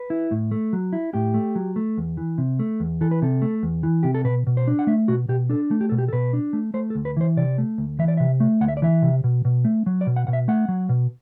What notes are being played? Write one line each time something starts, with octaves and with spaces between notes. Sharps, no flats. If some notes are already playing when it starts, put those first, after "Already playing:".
Already playing: B4
E4
A2
A3
F#3
E4
A2 G4
A3
F#3
A3
E2
E3
C3
A3
E2
E3 A4
B4
C3 A4
A3
E2
E3
C3 G4
A4
B2 B4
B2
C5
D4
F#5
A3 E5
B2 F#4
B2 G4
D4 A4
A3
G4
B2 A4
G4
A4
B2 B4
D4
A3
A3 C5
A4
D2
B4
E3 C5
C3 D5
A3
D2
E3 E5
D5
C3 E5
A3
D2 F#5
E5
D5
E3 E5
C3
B2
B2
A3
F#3
D5
B2
F#5
B2 F#5
E5
A3 F#5
F#3
B2